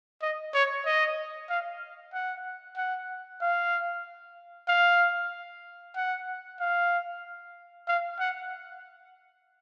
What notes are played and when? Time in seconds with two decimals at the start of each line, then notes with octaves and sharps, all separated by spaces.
0.22 D#5
0.54 C#5
0.86 D#5
1.50 F5
2.13 F#5
2.77 F#5
3.41 F5
4.68 F5
5.96 F#5
6.60 F5
7.88 F5
8.20 F#5